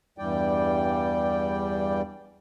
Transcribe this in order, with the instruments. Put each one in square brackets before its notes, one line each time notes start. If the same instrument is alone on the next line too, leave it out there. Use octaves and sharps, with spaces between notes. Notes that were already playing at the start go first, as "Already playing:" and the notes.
[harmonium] E2 G2 E3 G3 D5 G5